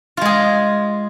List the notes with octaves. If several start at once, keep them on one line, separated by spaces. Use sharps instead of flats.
G#3 F4 G#4